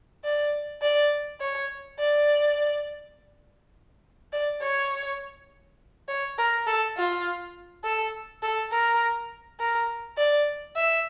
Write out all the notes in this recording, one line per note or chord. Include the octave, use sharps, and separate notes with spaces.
D5
D5
C#5
D5
D5
C#5
C#5
A#4
A4
F4
A4
A4
A#4
A#4
D5
E5